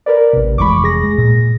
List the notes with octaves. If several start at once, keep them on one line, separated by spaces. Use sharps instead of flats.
A#4 B4 D5
A1 C3
F1 E3 G#3 B5 C#6 D6
G#4 A#6
G#3
A#2